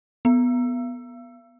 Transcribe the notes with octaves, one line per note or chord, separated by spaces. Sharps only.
B3